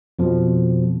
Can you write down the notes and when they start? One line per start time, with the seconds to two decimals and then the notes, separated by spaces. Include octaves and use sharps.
0.19 F2 B2 F3